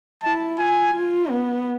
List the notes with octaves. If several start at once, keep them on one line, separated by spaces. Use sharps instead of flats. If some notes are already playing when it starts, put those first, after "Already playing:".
E4 A5
F4 G#5
F4
B3